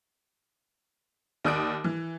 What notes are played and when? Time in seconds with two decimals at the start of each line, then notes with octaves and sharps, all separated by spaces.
1.44 D#2 D5 D#6 F#6 D7
1.84 E3